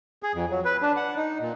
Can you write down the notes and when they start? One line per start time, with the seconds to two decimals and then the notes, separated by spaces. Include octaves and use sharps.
0.23 G#4
0.34 F2
0.51 F#3
0.65 B4
0.82 D4
0.96 F#5
1.16 D#4
1.40 A#2